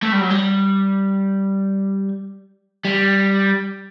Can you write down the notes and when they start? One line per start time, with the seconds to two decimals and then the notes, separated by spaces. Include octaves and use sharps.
0.02 A3
0.12 G3
0.21 F#3
0.31 G3
2.85 G3